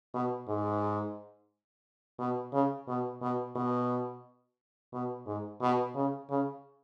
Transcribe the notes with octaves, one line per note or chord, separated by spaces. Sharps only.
B2
G#2
B2
C#3
B2
B2
B2
B2
G#2
B2
C#3
C#3